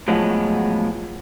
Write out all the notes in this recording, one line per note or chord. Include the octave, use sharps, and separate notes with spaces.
A2 F3 F#3 G#3 B3